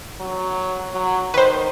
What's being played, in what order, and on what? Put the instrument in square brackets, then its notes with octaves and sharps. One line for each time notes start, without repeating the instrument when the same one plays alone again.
[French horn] F#3
F#3
[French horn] D#3 [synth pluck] B4 C5